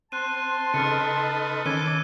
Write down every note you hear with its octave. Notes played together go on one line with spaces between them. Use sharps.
C4 A5 C6 F#6 D#7
C#3 D#4 A4 B4 F6 C#7
D#3 C#4 A5 D6 E6 G#6 D#7 G7